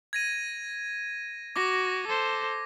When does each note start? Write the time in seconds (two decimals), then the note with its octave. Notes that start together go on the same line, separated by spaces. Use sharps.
0.13 G#6 A#6 D#7
1.56 F#4 D6 A#6
2.07 A4 C5